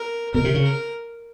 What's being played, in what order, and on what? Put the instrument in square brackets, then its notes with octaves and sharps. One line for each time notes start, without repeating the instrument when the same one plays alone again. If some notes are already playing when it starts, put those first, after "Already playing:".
Already playing: [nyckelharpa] A#4
[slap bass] B2 [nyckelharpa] A#4
[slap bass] C3
C#3
[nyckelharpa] A#4